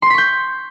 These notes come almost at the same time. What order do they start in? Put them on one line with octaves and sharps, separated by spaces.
C6 C7 B6 C#6 G6